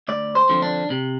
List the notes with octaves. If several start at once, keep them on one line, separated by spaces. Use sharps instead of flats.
D2 D5
C5
D3 F3 C4
D4
C3